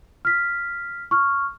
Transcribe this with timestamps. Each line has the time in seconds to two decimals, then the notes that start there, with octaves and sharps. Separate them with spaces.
0.25 F6 B6
1.11 C#6 F6